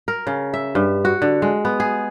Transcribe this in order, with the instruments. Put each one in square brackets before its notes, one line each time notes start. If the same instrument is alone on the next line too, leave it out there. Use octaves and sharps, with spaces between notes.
[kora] A#4
C#3
E5
G2
F#4
D3
G#3
B3
G#4